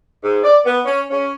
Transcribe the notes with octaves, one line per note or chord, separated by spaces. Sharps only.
G#2
D5
B3
C#4
C#4